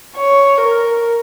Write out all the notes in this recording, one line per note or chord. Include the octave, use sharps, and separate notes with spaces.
C#5
A#4